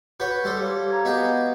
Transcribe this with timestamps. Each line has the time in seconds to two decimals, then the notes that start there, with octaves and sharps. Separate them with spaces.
0.20 F#4 B4 C#5 G6
0.44 G3 A4 C5
0.59 G4 C#5 F5
0.91 F5 A#5 G#6
1.05 B3 F#4 G#4 D#5 D6 G6